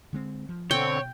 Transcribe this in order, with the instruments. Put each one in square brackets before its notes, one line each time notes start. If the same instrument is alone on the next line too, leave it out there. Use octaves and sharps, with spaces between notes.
[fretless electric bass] D3 G#3 C4
F3
[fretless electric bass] B2 [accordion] D3 C4 [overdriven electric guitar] C#5 [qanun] G5